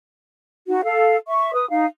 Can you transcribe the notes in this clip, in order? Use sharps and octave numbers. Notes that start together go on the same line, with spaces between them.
D#4 F#4
A4 F5
E5 C#6
B4 D#6
D#4 F5